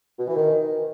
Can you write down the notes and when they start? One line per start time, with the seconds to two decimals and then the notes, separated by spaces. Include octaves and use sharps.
0.18 B2
0.27 E3
0.36 D#3